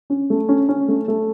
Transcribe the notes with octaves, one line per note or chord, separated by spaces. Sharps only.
C#4
A3
C#4
C#4
A3
A3